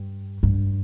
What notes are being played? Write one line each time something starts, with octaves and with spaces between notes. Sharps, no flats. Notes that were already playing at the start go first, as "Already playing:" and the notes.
Already playing: G2
G2